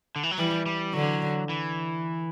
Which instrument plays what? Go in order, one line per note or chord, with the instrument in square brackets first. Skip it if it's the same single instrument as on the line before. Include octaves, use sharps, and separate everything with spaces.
[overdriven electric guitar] D3
E3
F#3
[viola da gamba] E3 [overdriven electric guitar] G3
[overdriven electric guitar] G3
[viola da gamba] D3 [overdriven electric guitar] F#3
[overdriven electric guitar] E3